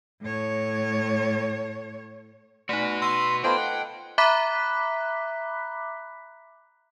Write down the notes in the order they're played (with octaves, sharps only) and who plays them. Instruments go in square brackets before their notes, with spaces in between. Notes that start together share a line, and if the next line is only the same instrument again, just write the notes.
[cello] A2 C#5
[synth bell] A3 D#4 [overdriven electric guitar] F#4 B4
[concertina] C6 [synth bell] E6 A#6 D#7
[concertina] B3 F4 C5 [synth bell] A4 D#5 A5 [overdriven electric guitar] G5
[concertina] F#5
[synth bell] E5 A#5 B5 D6 F#6 B6